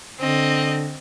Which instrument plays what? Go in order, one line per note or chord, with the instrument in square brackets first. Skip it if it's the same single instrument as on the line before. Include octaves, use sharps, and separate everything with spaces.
[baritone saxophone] D3 [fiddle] C4 D#5